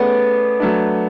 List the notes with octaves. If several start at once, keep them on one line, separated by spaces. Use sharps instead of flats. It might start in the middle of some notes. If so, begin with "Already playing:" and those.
Already playing: A3 B3 C#4 G#4 D5
F#3 A3 D4